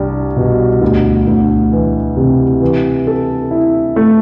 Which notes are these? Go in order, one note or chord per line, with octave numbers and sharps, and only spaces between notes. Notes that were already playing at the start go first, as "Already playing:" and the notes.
Already playing: C2 G3 D4
B2
D2
D2
E3
C3
E3
A4
E4
A3